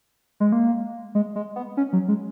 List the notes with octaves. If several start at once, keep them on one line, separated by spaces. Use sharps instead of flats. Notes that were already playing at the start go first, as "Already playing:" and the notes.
G#3
A#3
G#3
G#3
B3
C#4
F#3
G#3